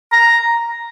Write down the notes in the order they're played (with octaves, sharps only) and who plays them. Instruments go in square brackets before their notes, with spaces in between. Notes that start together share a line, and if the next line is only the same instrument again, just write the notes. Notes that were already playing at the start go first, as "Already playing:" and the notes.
[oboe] A#5